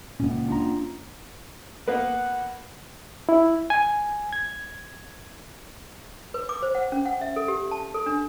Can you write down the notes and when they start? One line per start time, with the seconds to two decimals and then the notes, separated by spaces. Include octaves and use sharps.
0.20 C#2 A#2 A#3 C#4
0.49 D4 F4 A#5
1.88 A#3 B3 B4 F#5
3.29 E4
3.70 G#5
4.33 G#6
6.34 B4
6.49 D6
6.63 C5
6.75 F#5
6.92 C#4
7.06 F#5
7.21 E5
7.36 A4
7.48 G4
7.71 A5
7.94 A4
8.06 D4